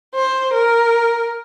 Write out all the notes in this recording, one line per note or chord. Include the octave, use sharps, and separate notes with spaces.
C5
A#4